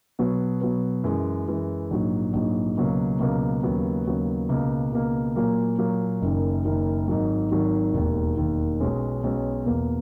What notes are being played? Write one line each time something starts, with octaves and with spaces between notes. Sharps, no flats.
B2 F#3 B3
B2 F#3 B3
F#2 E3 G#3
F#2 E3 G#3
A#1 G#2 F#3
A#1 G#2 F#3
C#2 B2 F#3 A#3
C#2 B2 F#3 A#3
D#2 C#3 F#3 B3
D#2 C#3 F#3 B3
C#2 B2 A#3
C#2 B2 A#3
A#2 F#3 A#3
A#2 F#3 A#3
F#1 F#2 D#3
F#1 F#2 D#3
G#1 G#2 D#3 F#3
G#1 G#2 D#3 F#3
E1 D#2 D#3
E1 D#2 D#3
B1 B2 G#3 C#4
B1 B2 G#3 C#4
E2 B2 A#3